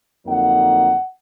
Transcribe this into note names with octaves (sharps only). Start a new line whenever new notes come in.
F2 D3 F#3 A#3 D#4 F#5